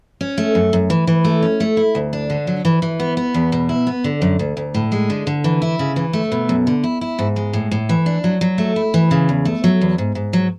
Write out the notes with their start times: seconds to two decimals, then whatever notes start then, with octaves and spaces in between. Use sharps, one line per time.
0.21 C#4
0.38 A3
0.55 F#2
0.73 F#2
0.90 E3
1.07 E3
1.25 A3
1.42 C#4
1.60 A3
1.77 E4
1.95 D2
2.13 D4
2.30 D3
2.47 F#3
2.65 E3
2.82 E3
3.00 B3
3.17 B3
3.34 E2
3.52 B2
3.69 E4
3.87 B3
4.04 D3
4.22 F#2
4.39 D2
4.57 D2
4.75 A2
4.92 G#3
5.10 D3
5.27 D3
5.44 E3
5.62 E4
5.79 C#3
5.96 E3
6.13 A3
6.32 B2
6.49 F#2
6.67 D3
6.84 E4
7.01 E4
7.19 G#2
7.36 G#3
7.53 A2
7.71 A2
7.89 E3
8.06 D4
8.24 F#3
8.41 F#3
8.58 A3
8.76 E4
8.94 E3
9.11 C#3
9.29 E2
9.45 A3
9.64 F#3
9.81 E2
9.98 G#2
10.15 G#2
10.33 F#3